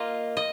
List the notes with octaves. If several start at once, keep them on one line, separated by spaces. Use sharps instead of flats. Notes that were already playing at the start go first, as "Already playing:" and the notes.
Already playing: A#3 F4 D#5
D#5